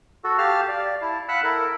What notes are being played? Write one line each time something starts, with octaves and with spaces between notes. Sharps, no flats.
F#4 A4
G4 F5 A5 F6
D5 F5
E4 A5
F5 F#5 B5 E6 F#6
E4 A4 A#4